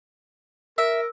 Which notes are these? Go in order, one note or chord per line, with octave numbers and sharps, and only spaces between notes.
A#4 E5